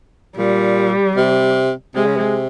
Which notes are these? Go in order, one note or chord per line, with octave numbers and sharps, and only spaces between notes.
A#2 G3
C3
C3 G#3
C#3
C3